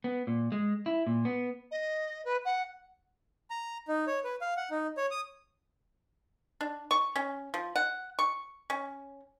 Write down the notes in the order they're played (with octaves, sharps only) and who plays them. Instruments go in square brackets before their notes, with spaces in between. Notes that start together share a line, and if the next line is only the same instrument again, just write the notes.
[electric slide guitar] B3
A#2
G#3
E4
A#2
B3
[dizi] D#5
B4
F#5
[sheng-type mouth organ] A#5
D#4
C#5
B4
F5
F#5
D#4
C#5
D#6
[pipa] D4
C#6
C#4
F3
F#5
C#6
C#4